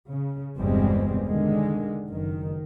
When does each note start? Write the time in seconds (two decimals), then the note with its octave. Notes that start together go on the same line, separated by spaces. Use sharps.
0.10 C#3
0.57 G1 E2 B2 G3 G#3 C4
1.26 D3 D#3 G#3
2.07 F#1 D#3